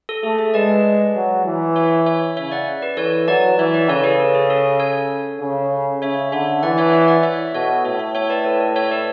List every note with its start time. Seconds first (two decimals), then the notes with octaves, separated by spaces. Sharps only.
0.09 A4
0.23 A3 G#4
0.39 G#4
0.54 G#3 B4 D5
1.15 F#3
1.45 E3
1.76 C#5 E5
2.06 C#5 E5
2.37 C#3 C#5 E5
2.52 D5 F#5
2.82 B4 D5
2.97 E3 A4 C#5
3.28 F#3 B4 D5
3.58 E3 C#5 E5
3.74 B4 D5
3.89 C#3 A4 C#5
4.04 G#4 B4
4.20 A4
4.35 G#4
4.50 A4
4.80 A4 C#5
5.41 C#3
6.02 C#3 C#5 E5
6.32 D3 C#5 E5
6.63 E3 D5 F#5
6.78 C#5 E5
6.93 C#5 E5
7.08 D5 F#5
7.23 C#5 E5
7.54 B2 A4 C#5
7.85 A2 C#5 E5
7.99 C#5 E5
8.15 C#5 E5
8.30 B4 D5
8.45 A4 C#5
8.60 A4
8.76 C#5 E5
8.91 B4 D5